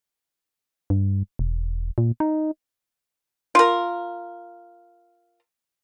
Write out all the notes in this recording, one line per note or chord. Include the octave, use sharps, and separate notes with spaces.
G2
E1
A#2
D#4
F4 A#4